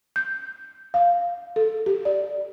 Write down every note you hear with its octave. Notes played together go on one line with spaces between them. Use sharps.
G6
F5
A4
G4
D5